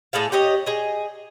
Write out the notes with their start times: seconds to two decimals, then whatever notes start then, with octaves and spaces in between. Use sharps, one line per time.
0.13 A2 G#4 A4 F5
0.32 G4 C#5 D#5
0.66 G#4 D#5